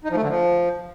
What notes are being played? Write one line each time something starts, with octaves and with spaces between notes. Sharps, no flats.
D#4
F3
A3
D3
F3